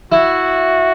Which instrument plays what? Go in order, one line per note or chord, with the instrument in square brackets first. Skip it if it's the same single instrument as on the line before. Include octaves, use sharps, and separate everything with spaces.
[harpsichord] E4 [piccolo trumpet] F#4